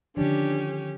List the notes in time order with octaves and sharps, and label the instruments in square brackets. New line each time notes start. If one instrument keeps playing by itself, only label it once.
[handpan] D3 D#3 F3 [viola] C#4 G4 [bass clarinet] D4